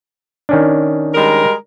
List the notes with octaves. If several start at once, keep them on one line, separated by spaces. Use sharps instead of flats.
D#3 C#4 D4
G3 G#3 A#4